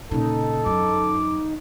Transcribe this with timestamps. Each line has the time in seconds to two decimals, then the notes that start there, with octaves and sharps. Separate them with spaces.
0.11 A#2 C#3 D#4 A4
0.66 F#2 D6